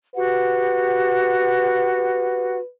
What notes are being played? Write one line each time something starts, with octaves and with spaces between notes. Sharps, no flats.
F#4 G4 B4 F#5